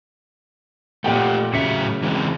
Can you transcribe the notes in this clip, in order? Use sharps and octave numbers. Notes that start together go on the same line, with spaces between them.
A#2 A3 G4 F#5 G5
A2 C#3 F#3 E5 B6 C#7
E3 G#3 C4